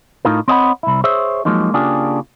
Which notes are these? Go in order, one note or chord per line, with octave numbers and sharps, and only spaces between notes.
A2 D#4 F4 A#4
C4 C#5 D#5 F#5 G5 B5
C2 E4
G#4 C5 C#5 E5
F3 F#3 G#3 A#3 D#4
C#3 A#3 D4 F4 G4 G#4